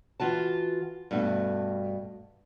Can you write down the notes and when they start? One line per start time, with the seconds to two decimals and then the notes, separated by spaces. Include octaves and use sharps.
0.20 E3 F4 F#4 A5
1.11 G2 B2 A3